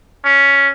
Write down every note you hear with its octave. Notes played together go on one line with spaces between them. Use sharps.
C#4